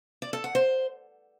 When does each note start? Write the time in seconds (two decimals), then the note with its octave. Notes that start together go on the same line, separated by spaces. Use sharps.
0.22 D5
0.33 A4
0.44 F#5
0.55 C5